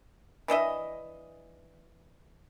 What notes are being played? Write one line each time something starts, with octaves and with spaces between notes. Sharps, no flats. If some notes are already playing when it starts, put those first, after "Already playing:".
E3 D4 D#5 E5